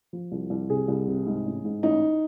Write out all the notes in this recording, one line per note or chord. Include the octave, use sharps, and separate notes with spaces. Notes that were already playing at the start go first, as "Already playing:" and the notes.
F3
C2
C2
C3 G#4
C2
C3
G#2
A1
G#2
A1 D#4